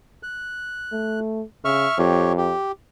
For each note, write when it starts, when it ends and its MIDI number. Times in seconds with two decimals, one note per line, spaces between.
0.23 1.20 90
0.92 1.43 57
1.65 1.87 49
1.65 1.98 76
1.65 1.98 85
1.65 1.98 89
1.98 2.54 41
1.98 2.33 67
1.98 2.33 73
2.38 2.72 67